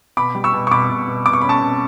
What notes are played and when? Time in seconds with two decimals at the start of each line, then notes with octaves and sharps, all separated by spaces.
0.17 B2 B5 D6
0.35 G3
0.44 C#6 E6
0.53 B2
0.67 C#6
0.71 B2 B5 D6
0.90 B2
1.08 B2
1.26 B2 D6
1.33 C#6
1.42 C#4 B5
1.49 A5 C#6
1.61 B2